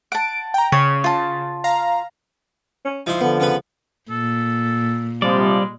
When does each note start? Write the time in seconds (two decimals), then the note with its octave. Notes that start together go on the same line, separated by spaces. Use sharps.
0.12 F#5 A5 D7
0.54 G5 A#5
0.72 C#3 C#5
1.04 F4 A5
1.64 F5 A#5
2.85 C#4
3.06 F3 D#4 E4 C6
3.21 D3 B3
3.40 C#3 B3 B4
4.10 A#2 A4
5.22 C3 F3 G3 G#3 D5